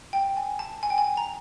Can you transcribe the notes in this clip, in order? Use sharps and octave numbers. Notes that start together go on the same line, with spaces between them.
G5
G#5
A5
G#5
G5
G#5
A#5